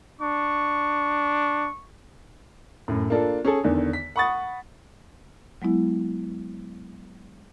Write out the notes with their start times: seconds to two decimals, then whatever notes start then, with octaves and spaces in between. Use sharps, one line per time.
0.21 D4 C#6
2.88 F#2 A2
3.10 A#3 D4 F4 A4
3.45 C#4 G#4 A4
3.64 E2 D3 D#3
3.93 B6
4.16 F#5 B5 C#6 D#6 A6
5.62 F#3 G#3 B3 E4